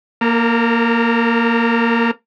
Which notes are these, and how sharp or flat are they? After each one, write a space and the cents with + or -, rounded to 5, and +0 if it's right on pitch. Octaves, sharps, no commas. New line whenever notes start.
A#3 +0 A#4 -40